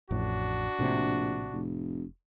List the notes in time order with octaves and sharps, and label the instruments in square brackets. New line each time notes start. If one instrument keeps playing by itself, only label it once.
[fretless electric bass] A1 F2 A2 [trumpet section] D4 F#4
[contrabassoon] A#1 [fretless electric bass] A2 C3
[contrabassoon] F1